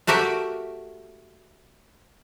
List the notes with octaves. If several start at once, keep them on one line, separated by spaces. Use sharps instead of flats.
A3 F#4 G4 A#4 E5